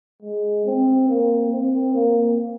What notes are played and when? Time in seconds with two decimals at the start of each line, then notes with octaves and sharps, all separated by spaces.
0.22 G#3
0.66 C4
1.09 A#3
1.51 C4
1.94 A#3